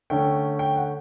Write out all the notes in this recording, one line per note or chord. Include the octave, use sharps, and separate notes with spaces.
D3 A3 C#4 G5
G5
F#5